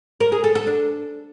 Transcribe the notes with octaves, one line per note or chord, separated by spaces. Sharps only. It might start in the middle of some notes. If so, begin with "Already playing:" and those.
A#4
G#4
A4
A4
D4